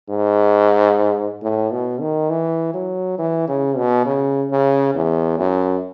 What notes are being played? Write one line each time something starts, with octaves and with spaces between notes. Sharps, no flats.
G#2
A2
B2
D#3
E3
F#3
E3
C#3
B2
C#3
C#3
E2
F#2